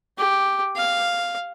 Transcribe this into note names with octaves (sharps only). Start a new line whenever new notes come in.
G4
F5